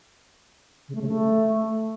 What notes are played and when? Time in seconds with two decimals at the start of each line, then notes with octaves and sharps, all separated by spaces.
0.89 C#3
0.95 A3
1.02 C#3
1.08 A3